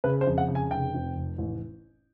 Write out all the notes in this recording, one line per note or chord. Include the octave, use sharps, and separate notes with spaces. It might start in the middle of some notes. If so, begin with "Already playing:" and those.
C#3 B4
C5
F2
F#5
C#3
G#5
F1 G5
F2
F1
A1